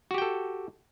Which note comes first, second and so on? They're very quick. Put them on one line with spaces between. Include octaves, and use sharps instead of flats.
F#4 G4 G5 A4